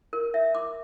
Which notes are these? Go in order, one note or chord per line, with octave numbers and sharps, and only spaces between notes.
A#4
E5
D6